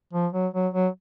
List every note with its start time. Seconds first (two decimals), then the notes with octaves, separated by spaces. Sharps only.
0.13 F3
0.33 F#3
0.54 F#3
0.74 F#3